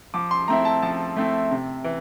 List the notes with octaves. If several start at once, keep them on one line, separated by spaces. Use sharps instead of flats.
F3 D6
C6
A3 C4 E4 A#5
A5
F3 A5
A3 C4 E4
C3
E3